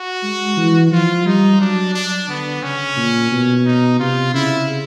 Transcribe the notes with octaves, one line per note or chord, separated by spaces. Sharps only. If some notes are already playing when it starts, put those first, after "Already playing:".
Already playing: F#4
G#3
E3
F3 F4
G3 D#4
F#3 D4
D4
D3 B3
C#3 C#4
A#2
B2
D#4
C3 F4
C#3 E4